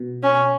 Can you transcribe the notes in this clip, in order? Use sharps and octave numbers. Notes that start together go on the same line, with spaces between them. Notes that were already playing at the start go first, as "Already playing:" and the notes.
Already playing: B2
C#4